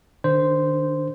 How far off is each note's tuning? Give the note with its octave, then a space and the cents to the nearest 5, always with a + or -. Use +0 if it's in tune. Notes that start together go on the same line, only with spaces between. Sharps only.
D#3 -30 D4 -5 C5 -10